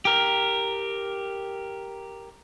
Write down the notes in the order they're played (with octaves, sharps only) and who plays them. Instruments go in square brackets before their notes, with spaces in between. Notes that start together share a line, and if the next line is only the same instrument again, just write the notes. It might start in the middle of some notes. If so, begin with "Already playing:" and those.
[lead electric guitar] G4 A#4